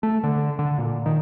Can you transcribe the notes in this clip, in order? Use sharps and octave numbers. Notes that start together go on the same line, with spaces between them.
A3
D3
D3
A#2
D#3